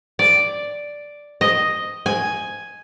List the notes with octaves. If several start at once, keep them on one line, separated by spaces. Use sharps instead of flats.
D5
D#5
G#5